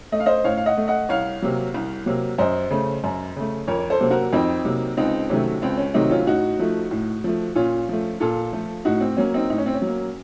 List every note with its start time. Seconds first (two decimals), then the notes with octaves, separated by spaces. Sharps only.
0.12 A3 D#5
0.20 F5
0.26 C5 D#5
0.44 A2 C#5 F5
0.57 F5
0.66 D#5 F#5
0.77 A3
0.88 D#5 F#5
1.09 C2 C#5 F5
1.42 C3 F#3 A#3
1.74 C2
2.06 C3 F#3 A#3
2.38 F#2 C5 D#5
2.71 C#3 A3
3.04 F#2
3.36 C#3 A3
3.67 F2 A#4 C#5
3.79 C#5
3.90 A4 C5
4.00 C3 F#3 A#3
4.11 F#4 A#4
4.33 F2 C4 D#4
4.65 C3 F#3 A#3
4.97 C#2 C4 D#4
5.29 C3 D#3 F#3 A3 C#4
5.62 C#2 C4
5.77 C#4
5.94 C3 D#3 F#3 A3 C4 D#4
6.11 C#4 F4
6.27 A2 D#4 F#4
6.59 F3 A3
6.91 A2
7.24 F3 A3
7.55 A#2 C#4 F4
7.89 F3 A3
8.20 A#2 F4 A4
8.53 F3 A3
8.85 A2 D#4 F#4
9.01 C4
9.17 F#3 A#3 C#4
9.34 C4 D#4
9.50 A2 D#4
9.58 C#4
9.66 C4
9.74 C#4
9.82 F#3 A#3